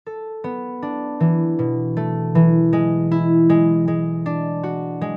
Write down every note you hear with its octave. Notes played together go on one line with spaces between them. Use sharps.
A4
B3
D4
E3
B2
A3
E3
G#3
E4
G#3
G#3
D4
F#4
G#3